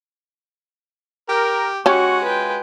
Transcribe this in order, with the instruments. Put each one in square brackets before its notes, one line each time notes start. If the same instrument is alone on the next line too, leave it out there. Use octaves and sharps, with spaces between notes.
[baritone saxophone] G4 [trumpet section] A#4
[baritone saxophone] G#3 [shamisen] C#4 G4 [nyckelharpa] F#4 F#5 [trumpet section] C#6
[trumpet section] F4 [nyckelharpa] B4 G5